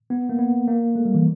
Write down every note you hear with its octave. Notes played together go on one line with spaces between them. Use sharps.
B3
A#3
B3
A#3
A3
G3
E3